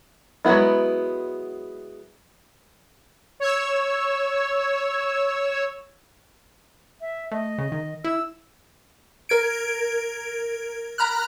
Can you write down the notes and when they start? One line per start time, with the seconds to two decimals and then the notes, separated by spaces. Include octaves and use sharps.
0.45 F#3 G#3 A#3 B3 E4
3.40 C#5 E6
7.01 E5
7.31 A3 D#5
7.58 C#3
7.72 D#3
8.04 E4 E6
9.29 A#4 G#6 D7
10.98 A#5 B5 F6 F#6